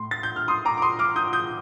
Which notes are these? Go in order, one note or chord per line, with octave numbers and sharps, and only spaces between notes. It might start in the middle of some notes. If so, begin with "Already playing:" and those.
Already playing: A2 C6
A6
G6
F6
C6 D#6
A#5 D6
D6
C6 D#6
D6 F6
D#6 G6
D#6 G6